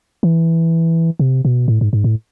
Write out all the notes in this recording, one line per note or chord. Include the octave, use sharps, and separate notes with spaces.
E3
C3
B2
A2
G#2
G#2
A2